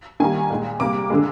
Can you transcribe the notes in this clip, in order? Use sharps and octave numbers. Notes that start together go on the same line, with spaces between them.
D#3 G3 A#3 G#5
A#2 G#3
C3 G3 A#3 D6
D3 G#3